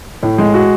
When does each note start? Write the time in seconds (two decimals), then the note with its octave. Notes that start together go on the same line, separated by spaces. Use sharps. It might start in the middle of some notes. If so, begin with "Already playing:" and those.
0.23 A2
0.38 G#3
0.54 F#4